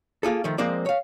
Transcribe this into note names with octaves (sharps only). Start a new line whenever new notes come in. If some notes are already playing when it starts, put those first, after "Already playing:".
A#3 F4 G#4 A4
D#3 F3 A3
F3 G#3 A#3 C4 C5 D5
C#5 F5